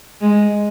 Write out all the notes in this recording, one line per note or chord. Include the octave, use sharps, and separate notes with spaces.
G#3